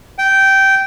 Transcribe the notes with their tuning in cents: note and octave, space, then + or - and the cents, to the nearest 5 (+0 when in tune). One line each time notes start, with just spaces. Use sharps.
G5 -15